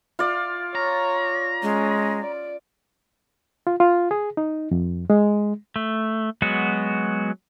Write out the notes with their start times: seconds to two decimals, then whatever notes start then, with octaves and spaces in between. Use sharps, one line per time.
0.19 F4 D5
0.75 C#5 A#5
1.63 G#3 C#4
2.22 D5
3.67 F4
3.80 F4
4.11 G#4
4.37 D#4
4.71 F2
5.10 G#3
5.76 A3
6.42 F#3 G#3 B3 F#4